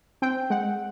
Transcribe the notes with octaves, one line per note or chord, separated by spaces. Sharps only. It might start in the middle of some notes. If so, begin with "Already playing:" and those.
C4 G5
G#3 F#5